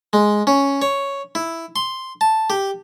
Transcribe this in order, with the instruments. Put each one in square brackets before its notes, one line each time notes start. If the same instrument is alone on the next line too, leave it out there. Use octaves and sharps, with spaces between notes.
[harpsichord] G#3
C#4
C#5
E4
C6
A5
G4